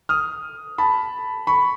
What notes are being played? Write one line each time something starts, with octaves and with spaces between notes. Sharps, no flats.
D#6 F6
A5 B5
B5 C#6